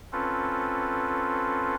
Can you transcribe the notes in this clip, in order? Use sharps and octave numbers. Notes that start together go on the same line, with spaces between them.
C4 C#4 F4 A4 B4